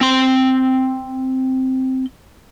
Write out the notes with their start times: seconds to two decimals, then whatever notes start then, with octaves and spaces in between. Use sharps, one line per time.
0.01 C4 C6